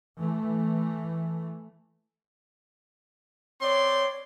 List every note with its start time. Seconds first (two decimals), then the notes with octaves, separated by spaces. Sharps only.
0.19 E3 A3
3.61 C4 C#5 D5 C6